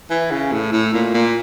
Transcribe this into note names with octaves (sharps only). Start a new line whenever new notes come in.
E3
C#3
A2
A2
A#2
A#2